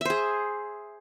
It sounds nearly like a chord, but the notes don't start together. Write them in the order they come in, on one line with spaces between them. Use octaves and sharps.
E5 C5 G#4